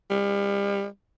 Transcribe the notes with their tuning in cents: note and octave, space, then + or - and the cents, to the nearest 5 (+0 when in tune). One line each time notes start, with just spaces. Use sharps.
G3 +35